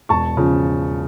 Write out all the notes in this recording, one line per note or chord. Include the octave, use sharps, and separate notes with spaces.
E1 A5 C#6
C#3 F3